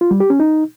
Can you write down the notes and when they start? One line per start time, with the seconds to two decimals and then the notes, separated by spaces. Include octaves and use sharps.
0.01 F4
0.11 G3
0.20 G4
0.30 C#4
0.40 D#4